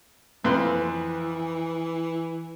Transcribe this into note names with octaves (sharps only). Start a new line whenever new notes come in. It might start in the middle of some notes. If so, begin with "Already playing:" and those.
F2 E3 B4 C6